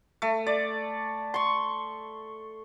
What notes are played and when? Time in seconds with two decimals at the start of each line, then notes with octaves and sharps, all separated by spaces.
0.22 A3
0.46 D5
1.34 C6 C#6